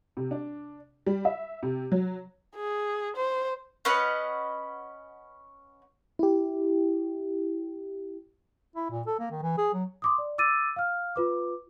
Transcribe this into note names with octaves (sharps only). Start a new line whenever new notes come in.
C3
D4
G3
E5
C3
F#3
G#4
C5
C#4 B4 D#5 F#5
E4 G4
E4
A#2
A4
A#3
D#3
E3
G#4
F#3
C6 D6 D#6
D5
D6 E6 A6 D#7
F5 F6
F4 B4 D6